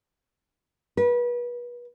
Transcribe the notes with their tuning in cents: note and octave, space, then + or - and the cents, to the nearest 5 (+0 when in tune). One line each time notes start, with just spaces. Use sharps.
B4 -35